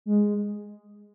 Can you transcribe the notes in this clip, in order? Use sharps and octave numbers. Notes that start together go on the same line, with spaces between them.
G#3